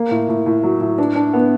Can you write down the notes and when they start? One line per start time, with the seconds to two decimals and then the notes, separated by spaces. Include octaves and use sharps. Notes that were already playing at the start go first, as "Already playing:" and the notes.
Already playing: A#3
0.11 A2
0.28 A2
0.46 A2
0.63 F#3
0.80 A2
0.98 D4
1.15 D4
1.33 B3